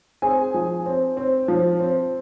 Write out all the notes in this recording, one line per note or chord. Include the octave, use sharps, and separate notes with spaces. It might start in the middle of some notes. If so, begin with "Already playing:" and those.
C4 G#4 G#5
F3
C4
C4
F3
C4